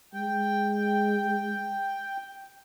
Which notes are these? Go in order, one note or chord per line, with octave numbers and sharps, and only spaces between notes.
G#3 G5